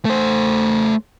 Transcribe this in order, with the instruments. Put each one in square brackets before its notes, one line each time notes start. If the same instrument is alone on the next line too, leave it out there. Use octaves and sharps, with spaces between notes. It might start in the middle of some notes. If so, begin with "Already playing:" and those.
[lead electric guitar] A3 C5